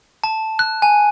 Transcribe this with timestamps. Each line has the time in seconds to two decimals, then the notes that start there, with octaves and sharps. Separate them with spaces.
0.24 A5
0.59 F#6
0.82 G#5